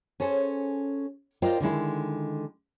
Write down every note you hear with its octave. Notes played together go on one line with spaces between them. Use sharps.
C#4 G#4 A4 C5
F4 A#4 C5 D5 D#5 G5
D3 D#3 G#3 E4